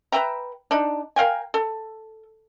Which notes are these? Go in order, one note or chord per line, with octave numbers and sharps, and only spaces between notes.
B4 E5 G5 A#5
D4 D#4
A#4 F5 G5 G#5
A4